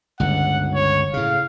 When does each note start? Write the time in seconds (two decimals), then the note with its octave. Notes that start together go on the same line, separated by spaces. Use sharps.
0.20 G1 C#2 F#5
0.75 C#5
1.13 A2 C#3 F5